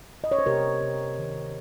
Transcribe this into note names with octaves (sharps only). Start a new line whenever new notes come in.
D#5
C#5
C5
C3 G4 A#4
C3
D#3